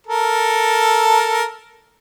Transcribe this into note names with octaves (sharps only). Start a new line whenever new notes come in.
A4 A#4